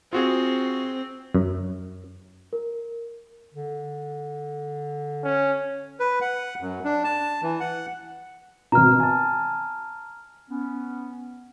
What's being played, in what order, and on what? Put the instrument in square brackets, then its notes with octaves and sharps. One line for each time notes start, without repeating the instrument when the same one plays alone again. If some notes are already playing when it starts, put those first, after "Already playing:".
[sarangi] C4 [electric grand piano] F4 F#4 G#4
[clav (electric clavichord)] F#2
[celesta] A#4
[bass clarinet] D3
[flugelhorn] C#4
[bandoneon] B4
F#5
F#2
D4
A5
E3
F#5
[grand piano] G#1 B2 [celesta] A#5 F6
[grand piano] G#5 A5
[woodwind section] B3 C#4